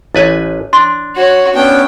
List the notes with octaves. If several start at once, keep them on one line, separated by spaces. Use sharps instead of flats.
A1 E4 B4 C#5 G#5
D4 C6
F#4 C#5
B3 C#4 D4 G5